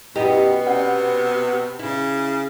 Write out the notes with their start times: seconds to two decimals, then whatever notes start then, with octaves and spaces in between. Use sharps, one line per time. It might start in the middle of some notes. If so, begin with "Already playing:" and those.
0.16 F#2 B2 B3 E4 G4 D#5
0.66 C3 C#4 D5 F#5
1.79 C#3 E4